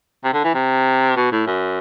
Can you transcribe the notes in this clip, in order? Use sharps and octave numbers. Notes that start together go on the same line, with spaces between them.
C3
D3
E3
C3
B2
A2
F#2